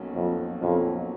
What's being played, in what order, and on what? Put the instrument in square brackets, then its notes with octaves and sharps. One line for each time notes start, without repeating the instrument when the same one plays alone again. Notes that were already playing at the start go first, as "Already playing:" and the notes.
Already playing: [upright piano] B1 B2 F#3 A#3 C#4
[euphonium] F2
[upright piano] B1 B2 F#3 A#3 C#4 [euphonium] F2